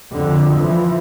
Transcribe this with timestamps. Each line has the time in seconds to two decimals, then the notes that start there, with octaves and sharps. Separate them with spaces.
0.12 F2 D3
0.53 E3 F3